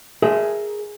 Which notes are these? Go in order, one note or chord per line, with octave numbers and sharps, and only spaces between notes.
G#4 A#4 E5